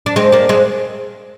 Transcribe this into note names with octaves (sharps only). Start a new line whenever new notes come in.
D4
G#3 C4
A#3 D4
G#3 C4